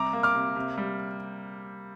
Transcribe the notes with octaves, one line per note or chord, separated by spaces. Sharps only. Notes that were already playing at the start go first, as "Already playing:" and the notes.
Already playing: C3 G3 A#5 D6
A#3
D6 F6
C3
C3
G3